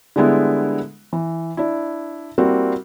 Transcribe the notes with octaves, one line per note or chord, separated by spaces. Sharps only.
D3 G3 G#3 B3 E4
E3
D4 E4
G3 A#3 C4 E4 F#4